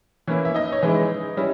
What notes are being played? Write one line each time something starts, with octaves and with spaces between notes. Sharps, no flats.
E3 A#3 C#4 E4 C#5
E5
D#4 D#5
C#5
E3 G#3 C#4 D#4 E4 D#5
G3 C#4 E4